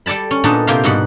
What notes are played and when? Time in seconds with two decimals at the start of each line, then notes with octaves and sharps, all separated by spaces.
0.06 G3 A4 D5 A5 B5
0.31 C#4
0.44 A#2 B3 D4 D#4 A4
0.67 C3 A#3 F4 G4 F5
0.84 G#2 B2 G3 F#5 B5